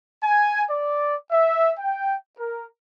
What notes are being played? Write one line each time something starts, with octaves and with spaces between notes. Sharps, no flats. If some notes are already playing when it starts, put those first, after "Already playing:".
G#5
D5
E5
G5
A#4